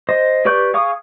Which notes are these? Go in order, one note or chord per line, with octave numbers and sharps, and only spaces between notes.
C5 D#5
G4 B4 D5 C#6 G6
G#4 F5 C#6 D#6